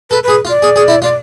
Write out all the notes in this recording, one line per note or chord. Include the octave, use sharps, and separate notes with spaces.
A4 B4
G#4 B4
F4
D5
G#4
G#4
E4
F4 D5